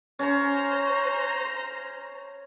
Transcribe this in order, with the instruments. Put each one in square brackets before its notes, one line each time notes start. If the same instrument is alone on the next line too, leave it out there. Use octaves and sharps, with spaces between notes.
[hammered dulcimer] C#4 [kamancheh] C5 A#5